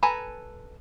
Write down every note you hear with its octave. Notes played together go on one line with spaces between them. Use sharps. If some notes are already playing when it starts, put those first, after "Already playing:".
A4 B4 G#5 A#5